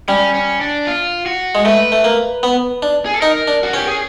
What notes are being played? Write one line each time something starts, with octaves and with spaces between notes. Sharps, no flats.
G3 C#4
C#4
D4
F4
F#4
G#3
A3 B4
A3
A#3
B3
D4
G#4
A4
D#4 A#4
D4
F#4
C#4 G4
G#4